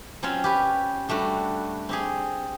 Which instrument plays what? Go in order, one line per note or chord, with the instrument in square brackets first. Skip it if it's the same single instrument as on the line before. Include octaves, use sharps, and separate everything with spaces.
[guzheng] F#3 C4 C#4 F4 C#5
G4 B4 C#5
G3 A3 D4 F#4
C4 G4 G#4